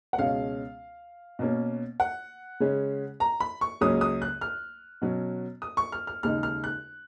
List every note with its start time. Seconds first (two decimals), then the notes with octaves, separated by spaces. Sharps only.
0.13 F#5
0.18 C#2 B2 G#3 C#4 F5
1.39 B2 A#3 C#4
2.00 F#5
2.60 C#3 G#3 C#4
3.20 A#5
3.40 B5
3.61 C#6
3.81 C#2 C#3 F#3 A#3 C#4 D#6
4.01 D#6
4.22 F#6
4.41 F6
5.02 B2 F#3 C#4
5.62 D#6
5.77 C#6
5.92 F6
6.07 F6
6.23 D#2 C#3 G#3 D#4 F6
6.43 F6
6.64 F#6